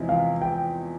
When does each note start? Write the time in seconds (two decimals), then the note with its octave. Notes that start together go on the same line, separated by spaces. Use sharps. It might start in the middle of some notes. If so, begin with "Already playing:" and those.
Already playing: E2 C3 F3 G#3 E4
0.09 F5
0.42 G5